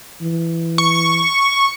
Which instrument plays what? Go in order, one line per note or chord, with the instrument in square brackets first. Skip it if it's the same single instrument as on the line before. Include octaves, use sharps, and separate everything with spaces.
[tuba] E3
[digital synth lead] C#6